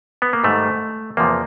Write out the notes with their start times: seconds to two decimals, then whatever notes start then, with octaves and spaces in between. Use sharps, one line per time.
0.22 B3
0.33 A#3
0.44 G#2 D#3 G3 A3
1.17 E2 C3 F3 A#3